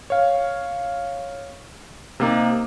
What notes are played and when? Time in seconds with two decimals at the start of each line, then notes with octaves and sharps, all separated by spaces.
0.10 C#5 F5
2.20 C3 A#3 D#4